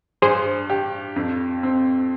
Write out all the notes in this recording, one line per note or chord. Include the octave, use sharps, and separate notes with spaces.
G2 G#4 C5
G4
F2
C4